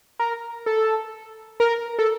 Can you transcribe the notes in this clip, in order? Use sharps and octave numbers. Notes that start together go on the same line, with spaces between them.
A#4
A4
A#4
A4